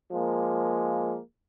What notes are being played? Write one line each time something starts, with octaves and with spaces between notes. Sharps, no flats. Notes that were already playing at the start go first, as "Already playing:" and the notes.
F3 G#3 A#3